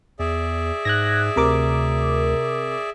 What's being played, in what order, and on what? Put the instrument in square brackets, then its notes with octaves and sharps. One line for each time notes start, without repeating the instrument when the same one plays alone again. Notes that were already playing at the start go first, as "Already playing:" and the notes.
[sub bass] E2 [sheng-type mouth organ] G#4 D5 E5
[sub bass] G#2 [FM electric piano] F#6 G#6 A#6
[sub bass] D2 [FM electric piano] C3 A#4 D6